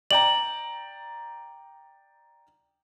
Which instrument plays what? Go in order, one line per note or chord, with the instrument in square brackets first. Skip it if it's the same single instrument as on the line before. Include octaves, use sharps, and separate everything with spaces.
[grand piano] D5 G5 A#5 [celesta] F#7